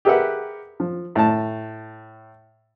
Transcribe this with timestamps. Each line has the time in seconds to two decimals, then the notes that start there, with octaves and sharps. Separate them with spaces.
0.05 G4 G#4 A#4 B4 E5 F#5
0.80 F3
1.16 A2 A5